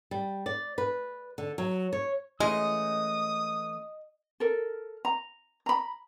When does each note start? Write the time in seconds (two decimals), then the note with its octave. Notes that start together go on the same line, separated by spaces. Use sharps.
0.11 G3
0.46 D5
0.78 B4
1.38 D3
1.58 F#3
1.93 C#5
2.40 E3 G#3 A3 C#4 D#5 D#6
4.40 A4 A#4
5.05 A#5
5.66 A#5 B5